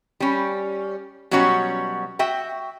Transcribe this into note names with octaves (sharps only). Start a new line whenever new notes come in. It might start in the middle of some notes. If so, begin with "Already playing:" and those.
G3 C#4
B2 F#3 G3 C#4 F#4 C#5
F#4 E5 G5